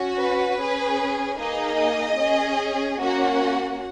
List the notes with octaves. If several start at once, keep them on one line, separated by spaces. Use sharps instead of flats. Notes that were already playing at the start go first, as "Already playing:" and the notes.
Already playing: C#4 F#4
B4
C#4 G#4
A#3 D#4 G#4 D#5
C#4 G#4
A#3 C#4 F#4 F#5